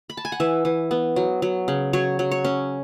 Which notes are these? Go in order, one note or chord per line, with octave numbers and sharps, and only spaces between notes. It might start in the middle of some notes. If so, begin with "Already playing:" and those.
B5
A5
G#5
F#5
E3 E5
E3
B3
F#3
F#3
C#3
F#3 C#5
F#3
C#5
C#4